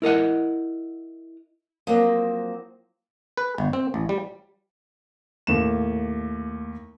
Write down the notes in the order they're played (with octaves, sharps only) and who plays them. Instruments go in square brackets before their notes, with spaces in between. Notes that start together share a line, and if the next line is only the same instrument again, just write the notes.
[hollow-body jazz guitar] E4 A#4 D#5 F#5
[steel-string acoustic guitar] F3 F#3 A#3 C4
[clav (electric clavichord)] B4
G1
C4
A1
G3
[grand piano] D#2 A2 E7